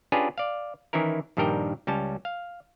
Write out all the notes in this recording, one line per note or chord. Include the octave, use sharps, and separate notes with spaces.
C#4 D4 F4 G4 G#4 B4
D5 F5
D#3 E3 C#4 E4 A#4
A#1 G2 D#3 G3 A#4 G5
C#2 G3 C#4 A5
F5